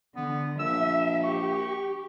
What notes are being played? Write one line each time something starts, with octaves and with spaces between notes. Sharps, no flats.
D3 B3
A#1 E5 E6
G4 C#6